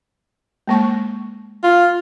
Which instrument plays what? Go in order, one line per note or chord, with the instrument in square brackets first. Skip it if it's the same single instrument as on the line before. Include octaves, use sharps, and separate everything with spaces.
[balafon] G#3 A#3 C#6
[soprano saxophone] F4